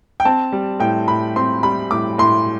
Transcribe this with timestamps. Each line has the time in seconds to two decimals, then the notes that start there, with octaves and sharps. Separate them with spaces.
0.20 G5
0.25 C4 A5
0.52 G3
0.80 A2 G5
1.08 A2 B5
1.36 C4 C6
1.63 G3 B5
1.91 A2 D6
2.18 A2 C6